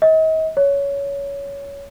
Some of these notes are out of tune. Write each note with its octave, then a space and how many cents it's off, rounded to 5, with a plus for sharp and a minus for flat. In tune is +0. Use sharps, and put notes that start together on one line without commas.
D#5 +40
C#5 +15